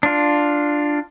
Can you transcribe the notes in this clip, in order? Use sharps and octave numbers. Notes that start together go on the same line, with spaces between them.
D4 F4